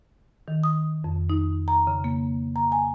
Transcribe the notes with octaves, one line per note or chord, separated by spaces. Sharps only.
D#3
D#6
F2
D#4
A#5
C#3
A#3
A#5
G#5